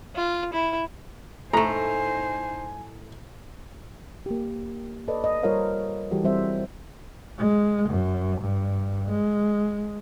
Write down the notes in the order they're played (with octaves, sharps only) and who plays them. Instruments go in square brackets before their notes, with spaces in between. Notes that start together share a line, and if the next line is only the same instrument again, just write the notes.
[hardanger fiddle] F4
E4
[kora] A2 A3 [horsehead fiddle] D#4 C5 [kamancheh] G#5 [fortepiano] A#5
[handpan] A#3 G4
A4 B4 D5 D#5
D#5
G3 F4 A#4 C5 C#5 F5
E3 G3 F#4 G4 A4
G3 C4 C5 E5
[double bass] G#3
F#2
G2
G#3